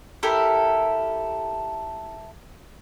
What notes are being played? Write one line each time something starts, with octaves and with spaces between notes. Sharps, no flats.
E4 G4 A4 A#4